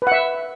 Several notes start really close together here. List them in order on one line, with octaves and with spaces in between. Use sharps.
B4 F#5 E5